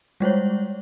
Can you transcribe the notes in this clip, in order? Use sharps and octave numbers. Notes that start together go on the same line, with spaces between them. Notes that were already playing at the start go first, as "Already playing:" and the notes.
G3 G#3 C5 C#5